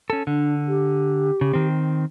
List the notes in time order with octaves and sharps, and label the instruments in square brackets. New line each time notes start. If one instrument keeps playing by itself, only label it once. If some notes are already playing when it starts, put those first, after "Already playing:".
[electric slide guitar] C#4 A4
[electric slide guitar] D3 [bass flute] D4
[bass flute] G4
[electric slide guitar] C#3
D#3 C4